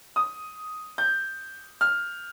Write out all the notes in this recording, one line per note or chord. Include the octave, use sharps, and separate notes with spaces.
D#6
G6
F6